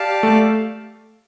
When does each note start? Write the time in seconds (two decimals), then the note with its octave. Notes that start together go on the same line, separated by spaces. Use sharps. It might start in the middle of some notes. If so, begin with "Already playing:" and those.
Already playing: G4 D5 F5 A5
0.23 A3